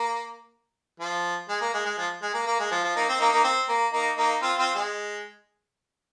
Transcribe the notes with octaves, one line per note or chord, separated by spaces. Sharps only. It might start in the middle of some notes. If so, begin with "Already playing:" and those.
Already playing: A#3
F3
G#3
A#3
G#3
G#3
F3
G#3
A#3
A#3
G#3
F3
F3
A#3 D#4
C4
A#3 D#4
A#3 D#4
C4
A#3
A#3 D#4
A#3 D#4
C4 F4
C4 F4
G#3